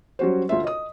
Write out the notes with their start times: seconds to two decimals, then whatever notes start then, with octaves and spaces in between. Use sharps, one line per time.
0.19 F#3 G3 C#4 F#4 C5
0.49 D2 F4 E5
0.64 D#5 D#6